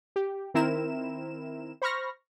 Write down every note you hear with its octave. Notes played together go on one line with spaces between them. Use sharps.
G4
D#3 C4 E4 A#4 E7
C5 B5 C#6 F6 A#6